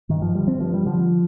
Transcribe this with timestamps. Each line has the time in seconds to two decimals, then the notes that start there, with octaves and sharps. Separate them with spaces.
0.09 G2 D#3
0.22 F3
0.35 D3 G3
0.48 C4
0.61 G2 F3
0.74 G3
0.86 D3 F3